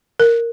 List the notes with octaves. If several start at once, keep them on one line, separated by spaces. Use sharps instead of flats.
A#4